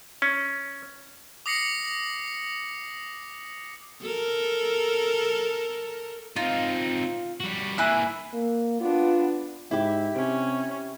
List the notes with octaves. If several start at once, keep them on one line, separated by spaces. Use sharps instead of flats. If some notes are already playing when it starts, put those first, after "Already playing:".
C#4
D6 D#6 A#6 C7 C#7 F#7
A4 A#4
C4 D#4 F4
G3 F#4
E3 A#3 E4 G#5 F#6
A#3
B3 D4 F4
G#2 E4 G4
C3 C#4